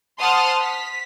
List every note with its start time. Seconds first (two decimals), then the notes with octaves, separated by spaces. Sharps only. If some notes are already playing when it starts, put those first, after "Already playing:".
0.20 C5 F#5 A5 C6 D#6 F6
0.61 B6